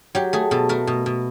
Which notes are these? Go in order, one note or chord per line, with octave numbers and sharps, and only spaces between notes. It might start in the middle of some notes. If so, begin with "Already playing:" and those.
F#3 G4
A3 G#4
B2 A4
A3 A#4
B2
B2